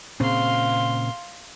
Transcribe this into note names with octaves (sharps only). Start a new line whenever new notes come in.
A#2 C#3 C4 F5 C6